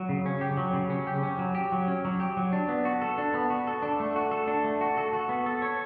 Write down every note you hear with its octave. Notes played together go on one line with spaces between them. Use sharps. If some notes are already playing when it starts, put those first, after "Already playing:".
Already playing: F#3
C#3
C#4
G4
F#3
C#3
C#4
G4
C#4
F#3
G4
F#3
C#4
F#3
G4
F#3
D4
B3
F#4
A4
D4
B3
F#4
A4
D4
A3
F#4
A4
D4
A3
F#4
A4
F#4
B3
A4
C#5